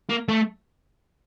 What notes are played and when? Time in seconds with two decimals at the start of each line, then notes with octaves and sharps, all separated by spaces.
0.10 A#3
0.28 A3